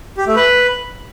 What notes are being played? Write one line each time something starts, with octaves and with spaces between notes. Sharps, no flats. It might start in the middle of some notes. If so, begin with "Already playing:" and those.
G4
A3
B4